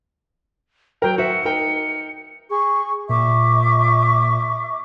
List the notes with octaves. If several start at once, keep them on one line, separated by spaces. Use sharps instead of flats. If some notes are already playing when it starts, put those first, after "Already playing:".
F#3 A#4 G5
F#4 C5 E5 C#7
D#4 A#4 G5
G#4 C#6
A#2 E5 C#6 D6